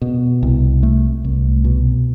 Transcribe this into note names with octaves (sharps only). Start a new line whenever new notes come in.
B2
C2
A3
C2
B2